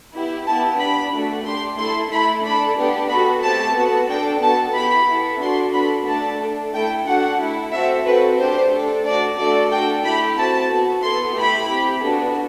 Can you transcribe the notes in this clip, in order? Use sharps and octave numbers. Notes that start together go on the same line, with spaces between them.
B3 E4 G4
B3 E4 G4 A5
D4 G4 B5
A3 D4 F#4 A4
D4 G4 C6
A3 E4 A4 C6
A3 E4 A4 B5
D4 A4 B5
B3 D4 G4
B3 F#4 A4 B5
A3 C4 G4 A5
B3 F#4 A4
D4 A4 G5
B3 F#4 A4 A5
B3 E4 G4 B5
B3 E4 A4
D4 F#4 A4 C6
B3 D4 F#4 A4 B5
A3 D4 A4 A5
D4 A4
A3 E4 A4 G5
D4 F#4 A4 F#5
A3 E4 A4
C4 F#4 A4 E5
C4 F#4 A4 B4
A3 D4 G4 C5
D4 A4
A3 D4 F#4 D5
A3 D4 F#4 A4 D5
D4 F#4 A4 G5
A3 E4 G4 B5
C4 F#4 A4 A5
B3 F#4 A4
B3 E4 A4 C6
A3 E4 G4 B5
C4 G4
B3 D4 F#4 A4